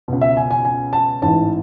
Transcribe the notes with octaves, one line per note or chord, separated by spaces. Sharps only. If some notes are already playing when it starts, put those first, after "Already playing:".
C#2 B2
E5
G#5
G#5
G#5
A5
A1 G#2 E3 A5